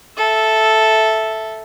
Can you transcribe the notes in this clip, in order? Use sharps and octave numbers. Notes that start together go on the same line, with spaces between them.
A4 E5